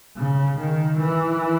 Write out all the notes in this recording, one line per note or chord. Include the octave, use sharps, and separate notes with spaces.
C#3
D#3
E3